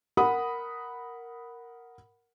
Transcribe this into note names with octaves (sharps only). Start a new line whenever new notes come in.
A#4 F#5 B5 D#6